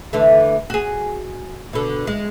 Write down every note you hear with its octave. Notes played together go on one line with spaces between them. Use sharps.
D3 E3 A3
F#4 G#4
B2 D3
G#3